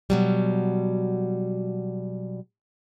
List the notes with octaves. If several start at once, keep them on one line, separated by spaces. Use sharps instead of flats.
B2 F#3 G3